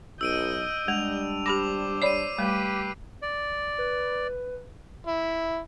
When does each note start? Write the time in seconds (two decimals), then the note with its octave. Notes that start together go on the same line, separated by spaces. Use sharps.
0.21 B1 D#5 E6 G6 D7 D#7
0.88 G3 G#3 D4 F7
1.46 G4 C5 B5 D6 A#6
2.02 C#5 D5 B5 C7 D#7
2.38 G3 A3 G4 B4
3.22 D5
3.78 B4
5.07 E4